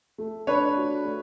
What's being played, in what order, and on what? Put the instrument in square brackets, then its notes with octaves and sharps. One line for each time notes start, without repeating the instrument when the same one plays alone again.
[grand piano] A3
[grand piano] D4 [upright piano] B4 C#5
[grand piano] F#4
A3